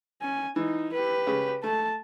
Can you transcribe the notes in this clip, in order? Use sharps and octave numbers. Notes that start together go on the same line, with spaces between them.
C#4 G#5
E3 D#4
G4 B4
C#3
A3 A5